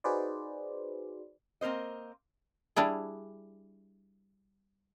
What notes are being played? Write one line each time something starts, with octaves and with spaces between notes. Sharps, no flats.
D#4 F#4 G#4 B4 C5 D5
A#3 C4 A#4 C5 D#5
G3 D4 E4 G#4